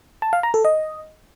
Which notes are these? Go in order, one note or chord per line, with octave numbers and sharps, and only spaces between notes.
A5
F5
A#5
A4
D#5